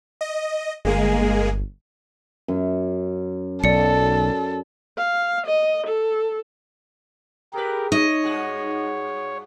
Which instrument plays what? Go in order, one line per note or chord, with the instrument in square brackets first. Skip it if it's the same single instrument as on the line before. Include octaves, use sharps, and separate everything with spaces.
[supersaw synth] D#5
[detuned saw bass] G1 [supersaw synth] G#3 A#3 G#4
[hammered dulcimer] F#2
[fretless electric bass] B1 [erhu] A4 [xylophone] D5 C#7
[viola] F5
D#5
A4
[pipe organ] G4 A#4 [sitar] G#4 B4
[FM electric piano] D#4 [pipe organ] C#5 [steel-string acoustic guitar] D#5
[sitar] G2 F#4 G#4